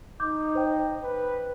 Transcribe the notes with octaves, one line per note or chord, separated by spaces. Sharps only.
D#4 D6 G6
C5 G5
B4